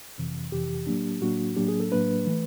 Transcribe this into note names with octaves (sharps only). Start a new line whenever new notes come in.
F2 C3 E3
F2 C3 E3 G4
A2 F#3 A#3 D4
A2 F#3 A#3 D4 F#4
A2 F#3 A#3 D4 G4
G#4
A4
A2 F#3 A#3 D4 B4
E3 A3